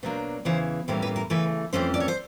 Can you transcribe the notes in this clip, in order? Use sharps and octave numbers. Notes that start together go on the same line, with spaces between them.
B2 F#3 A#3 D4 C5
E2 C#3 E3 C5
A2 E3 G3 A#3 C#4 C5
B4
A#4
C#3 E3 A3 B4
F2 C3 E3 A3 C#4 C5
D5
C#5
C5